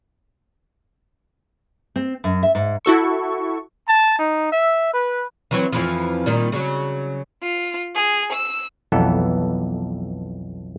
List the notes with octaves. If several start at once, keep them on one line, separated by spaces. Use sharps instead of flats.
C4
F#2
E5
G#2
E4 F#4 A4 C#6
A5
D#4
E5
B4
E3 F#3 C4
F2 E3 F3
A#2 D#3 G3
C#3 F#3
F4
G#4
E6
B1 F2 E3 B3 A4